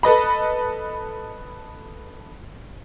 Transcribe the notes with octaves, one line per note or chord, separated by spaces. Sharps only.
A4 B4 D#5 B5